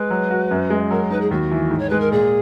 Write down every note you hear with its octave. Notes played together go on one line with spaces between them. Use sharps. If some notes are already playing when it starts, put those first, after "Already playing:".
Already playing: G#3 B4
F#3
F#4
F#2
G#3
F#3 A#4
D#4 B4
G#4
D#2 F#4
E3
G#2
C#5
G#3 B4
A#4
A#2 G#4